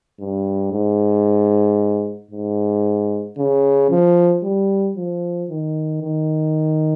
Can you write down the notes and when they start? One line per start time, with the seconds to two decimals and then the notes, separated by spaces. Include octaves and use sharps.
0.19 G2
0.72 G#2
2.31 G#2
3.38 C#3
3.90 F3
4.43 G3
4.97 F3
5.50 D#3
6.02 D#3